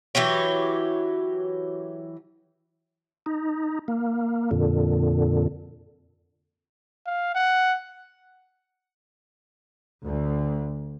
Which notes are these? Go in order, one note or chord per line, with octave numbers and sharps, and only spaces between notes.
E3 F#3 G4 C#5
D#4
A#3
F2 A#2 D3
F5
F#5
D2